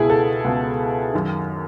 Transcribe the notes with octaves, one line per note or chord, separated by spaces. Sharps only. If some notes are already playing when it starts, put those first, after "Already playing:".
Already playing: C#2 B2 E4 G#4
A4
C#2 B2
F#2 D#3